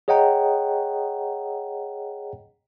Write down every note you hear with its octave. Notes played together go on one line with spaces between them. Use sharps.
G#4 C#5 D#5 F#5 G5 A#5